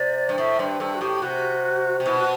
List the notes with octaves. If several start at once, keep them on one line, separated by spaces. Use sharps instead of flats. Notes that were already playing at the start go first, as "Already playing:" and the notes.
Already playing: C3 D5
G2
A2 E5
G2 C5
G2 A4
F#4
A2 G4
C3 F#4
C3
B2 E4
F#4